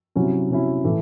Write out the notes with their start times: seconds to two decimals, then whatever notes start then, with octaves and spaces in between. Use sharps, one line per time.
0.15 C3 F#3 C#4 E4
0.50 C3 F#3 C#4 E4
0.84 A2 E3 A3